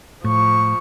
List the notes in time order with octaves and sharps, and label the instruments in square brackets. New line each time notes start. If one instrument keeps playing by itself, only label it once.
[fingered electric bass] A2 [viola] F3 C#6